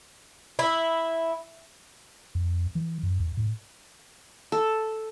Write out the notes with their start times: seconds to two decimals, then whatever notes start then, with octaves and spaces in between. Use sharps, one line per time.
0.59 E4
2.35 F2
2.75 E3
3.03 F#2
3.20 E2
3.37 A2
4.52 A4